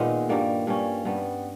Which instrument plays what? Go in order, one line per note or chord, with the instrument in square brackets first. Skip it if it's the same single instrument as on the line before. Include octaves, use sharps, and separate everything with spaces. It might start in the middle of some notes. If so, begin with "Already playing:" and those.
Already playing: [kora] A#2 D#3 G#3 B3 D#4
G2 G3 A#3
G2 G3 C#4
G2 G3 B3